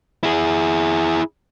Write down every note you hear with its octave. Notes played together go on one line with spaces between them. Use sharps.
E4 G#4